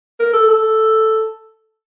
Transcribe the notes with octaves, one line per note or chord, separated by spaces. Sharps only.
A#4
A4
A4